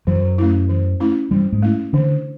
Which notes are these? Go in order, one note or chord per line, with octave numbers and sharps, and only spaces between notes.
F#2 E3 F#3
A3 C#4 E4
E3
A3 C#4 E4
G2 E3 G3
G#2 G#3
A3 C#4 E4
D3 E3 D4